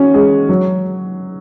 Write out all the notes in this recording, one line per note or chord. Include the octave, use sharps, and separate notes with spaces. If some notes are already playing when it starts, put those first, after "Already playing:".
Already playing: C#4 F#4
G#3
F#3